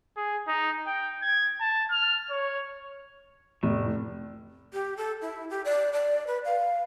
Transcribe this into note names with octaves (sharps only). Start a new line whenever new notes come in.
G#4
D#4
G5
G#6
A5
F6
C#5
F1 A2
G4
A4
E4
G4
D5
D5
B4
F5